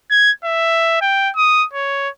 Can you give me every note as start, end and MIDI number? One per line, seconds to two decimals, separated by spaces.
0.10 0.31 92
0.44 0.96 76
1.01 1.30 79
1.36 1.65 87
1.73 2.09 73